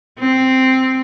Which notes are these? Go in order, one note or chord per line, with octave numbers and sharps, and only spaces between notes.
C4